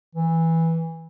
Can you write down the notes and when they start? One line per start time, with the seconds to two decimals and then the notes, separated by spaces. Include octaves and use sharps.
0.15 E3